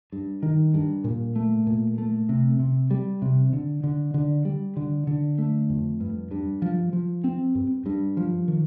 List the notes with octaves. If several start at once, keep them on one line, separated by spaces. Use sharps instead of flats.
G2
D#3
G2
A#2
A3
A#2
A3
C3
C3
G3
C3
D3
D3
D3
G3
D3
D3
A3
F2
G2
G2
F3
F3
C4
G2
G2
F3
D#3